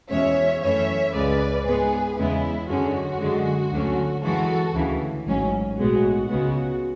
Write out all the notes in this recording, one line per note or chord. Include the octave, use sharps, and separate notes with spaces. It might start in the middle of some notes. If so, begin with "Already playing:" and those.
E2 B2 G#3 C#4 C#5 E5
F#2 E3 A3 C#4 C#5 E5
C#2 C#3 G#3 C#4 B4 D5
G#2 G#3 B3 G#4 B4
E2 C#3 G#3 B3 E4
F#2 D3 G#3 C#4 F#4
F#2 D3 G#3
D2 D3 F#3 C#4
F#2 E3 G#3 F#4 A4
D2 C#3 E3
A1 G#2 F#3 C#4
B1 A2 G#3 B3 F#4
C#2 C#3 G#3 B3 F#4